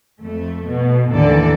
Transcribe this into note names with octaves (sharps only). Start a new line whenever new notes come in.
F2 A3
B2
D#2 A2 D3 E3 A4 D5